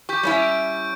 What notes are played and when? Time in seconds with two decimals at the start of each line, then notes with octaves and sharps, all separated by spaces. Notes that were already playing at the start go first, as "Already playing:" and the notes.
0.09 G4 C#6 G6
0.23 G3 C#4 E4
0.42 D7